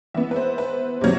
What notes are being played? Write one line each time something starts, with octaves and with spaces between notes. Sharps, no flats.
E3 B3 E5
B4
C5
B4
C3 F#3